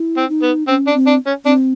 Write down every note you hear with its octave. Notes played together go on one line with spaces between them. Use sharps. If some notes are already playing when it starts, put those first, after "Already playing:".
Already playing: E4
C4
D#4
B3
C4 C#4
D4
C4
D4
C#4
C4 D4